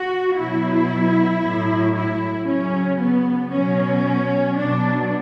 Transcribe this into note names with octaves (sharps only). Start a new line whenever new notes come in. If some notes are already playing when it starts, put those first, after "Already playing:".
Already playing: F#4
B2 F#3 E4
A2 F#3
E4
C#3 F#3 C#4
B3
B2 F#3 C#4
B2 F#3 D4